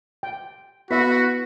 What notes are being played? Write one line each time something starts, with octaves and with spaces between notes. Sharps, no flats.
G5
B3 E4 F#4 B4 E5 B6